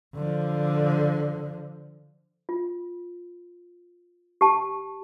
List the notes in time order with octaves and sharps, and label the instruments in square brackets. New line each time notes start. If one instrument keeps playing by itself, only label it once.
[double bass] D3 F3
[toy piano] F4
G4 A5